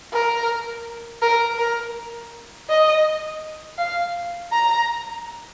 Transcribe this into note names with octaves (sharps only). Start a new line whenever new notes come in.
A#4
A#4
A#4
D#5
F5
A#5